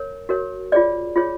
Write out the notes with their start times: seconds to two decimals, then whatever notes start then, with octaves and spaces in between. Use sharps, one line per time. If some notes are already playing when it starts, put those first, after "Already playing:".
Already playing: A#4 C#5
0.29 F#4 A#4 C#5
0.72 F4 G#4 C#5 D5
1.16 F4 G#4 C#5